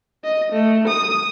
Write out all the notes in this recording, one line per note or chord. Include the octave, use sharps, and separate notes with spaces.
D#5
A3
D#6